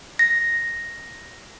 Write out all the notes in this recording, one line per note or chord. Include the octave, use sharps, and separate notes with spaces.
A#6